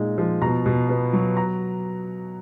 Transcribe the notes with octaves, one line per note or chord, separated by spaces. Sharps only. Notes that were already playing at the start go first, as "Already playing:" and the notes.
Already playing: A#2 G#3 D#4
F3
B2 A#5
B2
B3
F#3
A#5